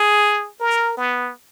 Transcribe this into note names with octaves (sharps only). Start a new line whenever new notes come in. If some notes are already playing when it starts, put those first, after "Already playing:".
Already playing: G#4
A#4
B3